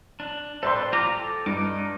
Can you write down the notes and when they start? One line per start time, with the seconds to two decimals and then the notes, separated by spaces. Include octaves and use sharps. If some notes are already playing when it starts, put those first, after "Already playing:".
0.20 D4
0.63 A4 B4 C5 D5 G5 C6
0.93 F4 G4 A#5 D6
1.11 A4
1.46 G2 D#4 D6